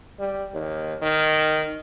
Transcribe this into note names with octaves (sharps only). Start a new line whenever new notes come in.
G3
D#2
D#3